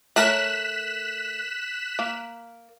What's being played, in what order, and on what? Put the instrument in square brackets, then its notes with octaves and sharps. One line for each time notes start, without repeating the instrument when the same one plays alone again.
[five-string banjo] A3 A#4 C#5 [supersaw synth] F#6 B6 E7
[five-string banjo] A#3